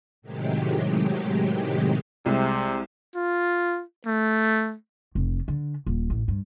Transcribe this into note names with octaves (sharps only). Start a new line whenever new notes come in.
A2 C3 D#3 F#3 G#3 G4
C2 C3 G#3
F4
A3
F1
D3
D#1
A1
G2